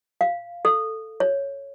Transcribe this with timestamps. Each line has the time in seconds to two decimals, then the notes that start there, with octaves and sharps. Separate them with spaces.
0.21 F5
0.65 A4
1.20 C#5